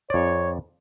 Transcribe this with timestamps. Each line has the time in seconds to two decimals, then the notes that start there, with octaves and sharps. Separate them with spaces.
0.10 F2 C#5 D5